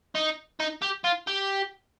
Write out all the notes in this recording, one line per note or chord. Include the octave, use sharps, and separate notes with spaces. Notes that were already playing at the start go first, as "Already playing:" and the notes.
D#4
D#4
G4
F4
G4